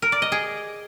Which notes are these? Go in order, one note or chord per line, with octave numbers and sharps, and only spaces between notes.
A#4
D5
D#5
G#4